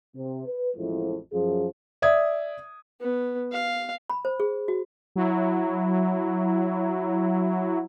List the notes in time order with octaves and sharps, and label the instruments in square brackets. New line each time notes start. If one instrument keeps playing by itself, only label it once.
[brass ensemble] C3
B4
A1 F2 F3 G#3 A3 E4
F#2 F3 G#4
[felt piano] D5 E5 D#6 G#6
[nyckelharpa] B3
F5
[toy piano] B5
C5
G#4
F#4
[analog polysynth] F#3 E4